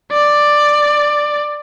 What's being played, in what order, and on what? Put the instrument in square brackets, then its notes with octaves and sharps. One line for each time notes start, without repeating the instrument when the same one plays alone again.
[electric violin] D5